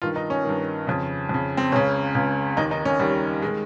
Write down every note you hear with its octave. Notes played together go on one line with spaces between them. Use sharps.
G2 D#3 F4
D#4
C#4
G2 D#3
F2 C#3
F2 C#3
C4
C#2 C#3 C#4
C#2 C#3
D#2 D#3 D#4
D#4
C#4
D#2 D#3 G3
D#3 G#3